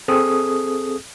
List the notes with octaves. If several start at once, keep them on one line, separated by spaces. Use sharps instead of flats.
C4 G#4 A4 D#6